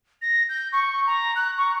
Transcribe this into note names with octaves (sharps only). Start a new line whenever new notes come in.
A#6
G6
C#6
A#5
F#6
C#6